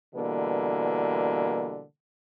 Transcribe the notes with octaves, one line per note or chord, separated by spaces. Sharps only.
B2 D3 E3 G3 A#3